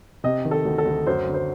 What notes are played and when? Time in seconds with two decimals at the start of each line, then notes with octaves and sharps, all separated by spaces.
0.24 C3 D#5
0.45 D#3
0.51 A4
0.65 D2
0.78 A4
0.85 D2
1.07 F#2 C5
1.27 D3
1.34 C5